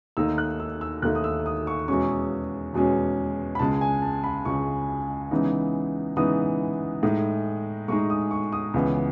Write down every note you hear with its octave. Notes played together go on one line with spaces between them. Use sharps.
D#2 D#3 A3 D#4 E6
F#6
E6
E6
D#2 D#3 A3 D#4 F#6
D#6
E6
D#6
C#6
E2 B2 G#3 C#4 C#6
E2 B2 G#3 C#4
B5
C#2 C#3 G#3 A5
G#5
A5
B5
C#2 C#3 G#3 C#6
C#3 E3 G#3 B3 D#4
C#3 E3 G#3 B3 D#4 D#6
A2 G#3 D#4
A2 G#3 D#4 C#6
D#6
C#6
D#6
C#2 C#3 E3 B3